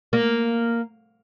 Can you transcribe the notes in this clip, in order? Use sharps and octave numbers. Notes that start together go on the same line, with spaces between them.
A#3